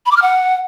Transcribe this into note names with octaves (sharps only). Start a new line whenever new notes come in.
B5
D6
F6
F#5